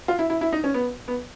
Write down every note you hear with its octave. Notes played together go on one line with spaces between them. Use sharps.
F4
E4
E4
E4
D#4
C#4
B3
B3